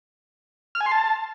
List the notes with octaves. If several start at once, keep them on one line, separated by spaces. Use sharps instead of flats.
F6
G#5
C6
A5